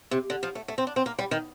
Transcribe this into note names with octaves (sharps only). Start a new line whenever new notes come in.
C3
D3
F3
A3
A3
C4
D4
C4
A#3
G3
D#3